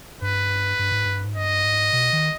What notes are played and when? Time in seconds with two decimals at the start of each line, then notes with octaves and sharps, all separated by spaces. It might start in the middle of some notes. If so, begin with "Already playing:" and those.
0.22 G2 B4
0.79 G2
0.92 G#2
1.05 G2
1.25 G#2
1.36 G2 D#5
1.64 G#2
1.93 B2
2.13 D#3